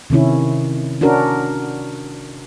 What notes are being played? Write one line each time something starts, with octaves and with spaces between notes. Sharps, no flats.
C3 D#3 C#4 E4
C#4 D4 F#4 A#4